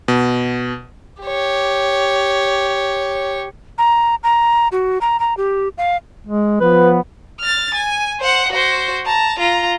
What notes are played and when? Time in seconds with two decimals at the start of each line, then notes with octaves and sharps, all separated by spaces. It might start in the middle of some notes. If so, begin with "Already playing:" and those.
0.08 B2
1.23 G4 C#5
3.78 A#5
4.24 A#5
4.72 F#4
5.01 A#5
5.20 A#5
5.37 G4
5.78 F5
6.26 G#3
6.60 F3 B3 B4
7.40 F6 A6
7.74 G#5
8.20 C5 F#5
8.52 F#4 C5
9.06 A5 A#5
9.39 F4 A#5